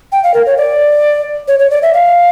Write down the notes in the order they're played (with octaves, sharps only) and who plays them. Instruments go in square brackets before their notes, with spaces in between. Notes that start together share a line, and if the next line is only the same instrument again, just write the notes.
[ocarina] G5
F5
A#4
C#5
D5
C#5
C#5
D5
E5
F5